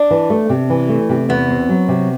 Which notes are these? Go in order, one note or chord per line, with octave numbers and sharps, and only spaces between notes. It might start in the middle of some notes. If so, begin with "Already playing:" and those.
Already playing: D4
E3
A3
C3
E3
A3
C3
E2 B3
C4
F#3
C3